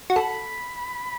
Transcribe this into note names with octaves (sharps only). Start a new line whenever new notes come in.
F#4
A4 B5